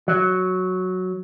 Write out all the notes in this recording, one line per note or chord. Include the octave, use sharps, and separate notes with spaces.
F#3